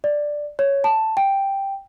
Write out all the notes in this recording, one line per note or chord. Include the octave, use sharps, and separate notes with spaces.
D5
C#5
A5
G5